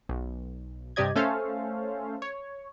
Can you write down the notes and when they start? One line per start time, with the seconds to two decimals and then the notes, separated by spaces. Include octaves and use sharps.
0.09 B1
0.96 G2 C3 G4 D5 D#5 G#6
1.16 A3 C#4 A4 C5 F5
2.22 C#5